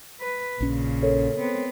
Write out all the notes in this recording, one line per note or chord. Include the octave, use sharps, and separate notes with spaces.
B4
A#1 A#2 C#3 C#4
A4 A#4 C#5
B3 C4